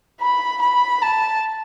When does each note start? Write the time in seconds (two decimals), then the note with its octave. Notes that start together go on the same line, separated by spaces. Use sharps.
0.20 B5
0.62 B5
1.02 A5